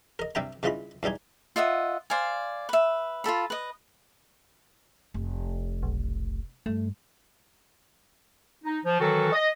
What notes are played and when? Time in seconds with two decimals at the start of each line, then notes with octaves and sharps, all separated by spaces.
0.19 A#4 D#5
0.35 G2 C3 G3 E5 G5 A#5
0.63 G2 C#3 E3 F4 D#5 B5
1.03 E2 B2 G3 D#4 G#5
1.56 F4 D#5 E5 F#5
2.10 C5 D5 F5 G#5
2.69 B4 E5
3.24 F4 F#4 A4 B5
3.50 B4 D#5
5.14 F1
5.83 B1
6.66 G2 A3
8.64 D#4
8.85 F3
9.00 D#3 E3 F#3 F#4 A4
9.33 D#5